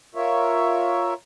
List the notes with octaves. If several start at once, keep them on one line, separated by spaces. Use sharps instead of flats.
F4 A#4 C#5 E5